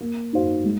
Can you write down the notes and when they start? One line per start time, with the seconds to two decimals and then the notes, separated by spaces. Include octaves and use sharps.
0.01 A#3
0.33 D#4 F#4 C5 F5
0.64 G#3